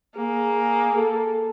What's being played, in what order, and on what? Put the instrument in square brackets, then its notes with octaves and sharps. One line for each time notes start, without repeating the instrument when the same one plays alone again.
[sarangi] A#3 [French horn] G#4
[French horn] A4